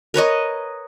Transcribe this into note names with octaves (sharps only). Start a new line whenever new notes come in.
A#4 B4 C#5 D#5